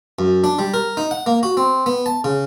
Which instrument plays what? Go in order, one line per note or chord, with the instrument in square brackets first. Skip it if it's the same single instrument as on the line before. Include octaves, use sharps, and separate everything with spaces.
[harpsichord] F#2
D4
G3
A#4
D#4
F#5
A#3
F#4
C4
B3
A5
C#3